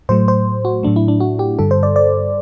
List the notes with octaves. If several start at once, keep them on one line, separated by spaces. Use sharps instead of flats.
A2 F#3 A3 C5
C5
F#4
A2 F#3 A3 D4
E4
D4
F#4
G4
G2 D3 G3 A4
C5
D5
D5